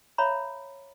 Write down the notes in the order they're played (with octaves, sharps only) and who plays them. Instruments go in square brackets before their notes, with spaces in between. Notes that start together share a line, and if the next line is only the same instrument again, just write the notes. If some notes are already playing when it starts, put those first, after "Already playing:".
[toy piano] C#5 E5 F5 A#5 B5